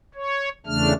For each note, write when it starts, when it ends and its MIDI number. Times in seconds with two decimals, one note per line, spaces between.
0.15 0.49 73
0.66 0.93 40
0.66 0.93 49
0.66 0.93 57
0.66 0.93 62
0.66 0.93 89